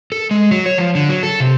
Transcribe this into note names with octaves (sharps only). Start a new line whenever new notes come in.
A4
G#3
F#3
C#5
F3
D3
F#3
A4
C3